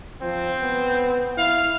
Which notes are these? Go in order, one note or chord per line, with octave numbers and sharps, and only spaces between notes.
F3 C4
B3
E4 F5